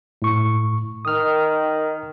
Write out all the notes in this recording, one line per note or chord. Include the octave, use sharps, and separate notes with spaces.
A2 C#6
D#3 D#6 F6